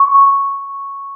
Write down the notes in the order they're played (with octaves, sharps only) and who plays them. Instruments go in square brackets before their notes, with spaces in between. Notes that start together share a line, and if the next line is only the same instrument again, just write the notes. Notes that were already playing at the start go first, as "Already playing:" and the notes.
Already playing: [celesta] C#6